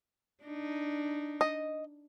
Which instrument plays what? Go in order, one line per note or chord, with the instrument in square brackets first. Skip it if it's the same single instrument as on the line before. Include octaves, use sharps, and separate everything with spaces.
[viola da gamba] D4 D#4
[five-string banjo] D#5